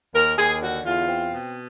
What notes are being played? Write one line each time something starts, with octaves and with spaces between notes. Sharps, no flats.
D#2 A#4
D#2 G#4
D3 F#4
E2 F4
C4
B2